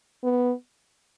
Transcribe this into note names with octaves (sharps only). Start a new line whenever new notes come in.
B3